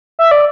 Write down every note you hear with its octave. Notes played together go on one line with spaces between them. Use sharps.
E5
D5